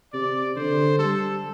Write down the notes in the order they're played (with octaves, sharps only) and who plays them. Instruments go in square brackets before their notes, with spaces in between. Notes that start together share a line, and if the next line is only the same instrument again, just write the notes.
[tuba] C3 [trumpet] D5
[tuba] D3 [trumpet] C5
[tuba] G3 [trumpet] A4